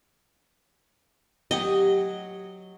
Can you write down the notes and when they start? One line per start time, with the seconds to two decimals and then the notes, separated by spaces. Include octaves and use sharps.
1.51 F#3 G4 D#5